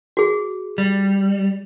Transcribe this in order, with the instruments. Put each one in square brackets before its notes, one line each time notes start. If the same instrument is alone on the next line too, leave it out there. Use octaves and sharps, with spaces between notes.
[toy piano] F#4 G#4
[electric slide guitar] G3